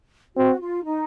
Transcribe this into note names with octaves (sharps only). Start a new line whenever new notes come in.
C4 F#4
F4
D#4